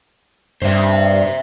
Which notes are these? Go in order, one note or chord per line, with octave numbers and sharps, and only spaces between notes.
G2 C5 E5